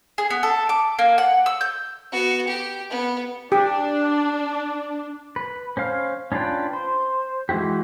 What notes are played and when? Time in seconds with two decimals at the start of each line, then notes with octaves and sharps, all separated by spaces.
0.18 G#4
0.30 B3
0.43 A4
0.69 D6
0.99 A#3
1.18 F#5
1.46 E6
1.61 G6
2.12 B3 F#4
2.48 G4
2.90 B3
3.52 D4 G4
5.36 B4
5.77 C#4 C5 F5 F6
6.32 C#4 D4 F4 B4 G5
6.73 C5
7.49 E3 G#3 E4 F#4 G4